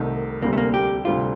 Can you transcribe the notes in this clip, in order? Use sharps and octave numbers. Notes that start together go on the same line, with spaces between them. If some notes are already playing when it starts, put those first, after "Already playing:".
Already playing: C2 C3 D#3 A3 D#4
D2 C3 G3 A#3
A3
A#3
G4
D2 C3 G3 C4 F4 G4